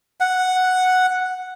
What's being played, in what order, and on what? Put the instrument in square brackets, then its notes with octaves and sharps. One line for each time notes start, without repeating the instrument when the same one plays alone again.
[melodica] F#5